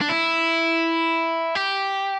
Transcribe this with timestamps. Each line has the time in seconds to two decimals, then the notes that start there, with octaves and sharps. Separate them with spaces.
0.01 D4
0.09 E4
1.55 G4